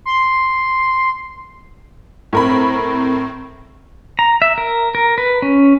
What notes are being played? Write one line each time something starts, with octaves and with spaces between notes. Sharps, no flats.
C6
A2 C4 A#4 B5
A#5
E5
A#4
A#4
B4
C#4